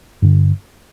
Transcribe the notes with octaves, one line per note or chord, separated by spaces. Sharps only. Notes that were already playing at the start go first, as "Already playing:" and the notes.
G2 D3